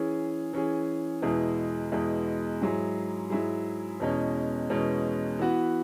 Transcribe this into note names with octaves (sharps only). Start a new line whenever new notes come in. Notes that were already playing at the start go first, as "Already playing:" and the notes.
Already playing: E3 C#4 G#4
E3 C#4 G#4
E2 B2 G#3 E4 G#4
E2 B2 G#3 E4 G#4
G#2 F#3 E4 G#4
G#2 F#3 E4 G#4
E2 B2 G#3 C#4
E2 B2 G#3 C#4
E3 B3 F#4